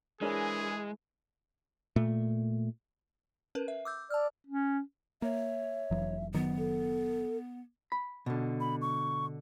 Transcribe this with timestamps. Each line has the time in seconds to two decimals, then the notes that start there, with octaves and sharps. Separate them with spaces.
0.21 E3 G#3 D4 G#4 A#4 C#5 G#5
1.96 A#2 A3
3.55 C#4 A#4 B4
3.68 E5
3.85 D6 E6 G6
4.10 D5 A5 E6 F6
4.47 C#4
5.22 A#3 C#5 E5
5.91 F1 E3 F#3
6.34 F#1 D#3 F#3 B3
6.58 A4
7.92 B5
8.26 B2 D3
8.60 B5
8.81 C#6